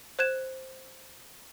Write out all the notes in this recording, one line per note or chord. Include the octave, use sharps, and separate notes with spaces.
C5 F#6 G#6 E7